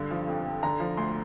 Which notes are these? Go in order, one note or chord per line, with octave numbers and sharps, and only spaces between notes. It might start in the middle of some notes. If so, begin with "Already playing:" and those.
Already playing: G2 D3
F3
F2
F2
D3 A#5
F3
D2 C6